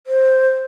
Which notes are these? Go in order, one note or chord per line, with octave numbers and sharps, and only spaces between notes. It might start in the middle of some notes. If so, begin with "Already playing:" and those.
C5